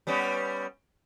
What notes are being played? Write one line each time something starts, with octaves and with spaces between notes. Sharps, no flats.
G3 B3 C#4